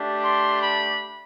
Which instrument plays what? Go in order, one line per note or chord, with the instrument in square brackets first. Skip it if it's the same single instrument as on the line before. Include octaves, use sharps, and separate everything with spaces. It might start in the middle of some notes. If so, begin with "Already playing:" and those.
Already playing: [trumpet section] A3 D4 G4
C6
B5